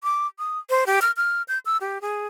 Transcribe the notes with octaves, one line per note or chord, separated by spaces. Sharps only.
D6
D#6
C5
G4
F6
F6
G6
E6
G4
G#4